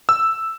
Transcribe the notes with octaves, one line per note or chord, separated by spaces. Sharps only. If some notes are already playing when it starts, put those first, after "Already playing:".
E6